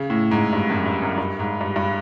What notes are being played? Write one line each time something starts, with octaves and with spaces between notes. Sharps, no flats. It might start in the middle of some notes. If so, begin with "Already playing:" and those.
Already playing: C#3
A2
G#2
G2
F#2
G2
F#2
G2
G#2
G2
G2